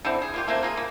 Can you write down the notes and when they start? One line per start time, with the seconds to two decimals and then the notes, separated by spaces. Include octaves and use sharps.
0.05 D3 E3 C4
0.22 G#4
0.34 A#3 F4 G4
0.48 A3 A#3 C4
0.63 A#3 F4 G#4
0.77 A#3